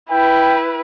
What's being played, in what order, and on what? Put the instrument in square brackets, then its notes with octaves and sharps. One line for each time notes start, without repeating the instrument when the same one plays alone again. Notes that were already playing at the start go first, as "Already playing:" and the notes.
[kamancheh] E4 B4 [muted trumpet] G5